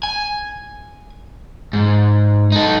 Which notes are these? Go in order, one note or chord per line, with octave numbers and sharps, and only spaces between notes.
G#5
G#2
D#4 A4